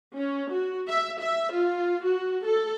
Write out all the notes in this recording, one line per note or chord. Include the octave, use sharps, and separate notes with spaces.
C#4
F#4
E5
E5
F4
F#4
A4